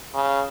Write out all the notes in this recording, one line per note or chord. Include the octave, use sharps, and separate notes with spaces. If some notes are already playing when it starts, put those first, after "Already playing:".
C#3